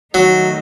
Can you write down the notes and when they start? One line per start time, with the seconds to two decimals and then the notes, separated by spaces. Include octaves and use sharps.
0.14 D#3 F#3 A3 D#4